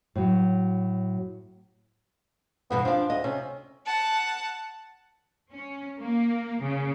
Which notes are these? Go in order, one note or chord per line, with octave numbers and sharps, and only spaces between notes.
A2 F#3
E2 G2 B2 B3
F3 D4 F5
D2 D#5
C3 C#4
F#5 A5
C#4
A#3
C#3